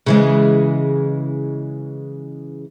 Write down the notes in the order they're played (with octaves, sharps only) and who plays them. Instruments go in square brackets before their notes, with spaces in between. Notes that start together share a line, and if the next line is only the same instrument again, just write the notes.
[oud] C#3 E3 G#3